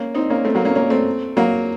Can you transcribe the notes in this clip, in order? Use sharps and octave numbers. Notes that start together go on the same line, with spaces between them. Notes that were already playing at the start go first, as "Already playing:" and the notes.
Already playing: A#3 C#4
C4 D#4
A#3 C#4
A3 C4
F#3 A#3
A#3 C#4
A#3 C#4
A3 C4
F#3 A#3